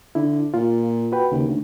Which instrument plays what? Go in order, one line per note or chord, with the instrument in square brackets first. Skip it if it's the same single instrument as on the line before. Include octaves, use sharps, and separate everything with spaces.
[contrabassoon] D3 [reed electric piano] E4
[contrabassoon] A#2 [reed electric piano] F4
[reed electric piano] F#4 B4 G5
[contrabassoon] D#2 [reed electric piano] C#3
[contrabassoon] D2